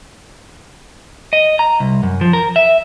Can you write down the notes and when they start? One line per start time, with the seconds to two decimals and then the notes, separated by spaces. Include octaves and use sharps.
1.33 D#5
1.59 A#5
1.80 C2
2.03 F#2
2.21 F3
2.33 A#4
2.56 E5